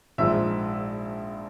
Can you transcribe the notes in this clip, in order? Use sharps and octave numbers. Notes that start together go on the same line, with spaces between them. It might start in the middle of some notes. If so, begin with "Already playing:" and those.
A#1 G#2 F3 E5